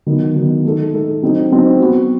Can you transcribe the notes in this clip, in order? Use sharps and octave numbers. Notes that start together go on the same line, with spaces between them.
D#3 F#3 B3 D#4
D#3 F#3 B3 D#4
A3 D#4 A4
A3 D#4 A4
F#3 C4 D#4
F#3 C4 D#4
F#3 B3 F#4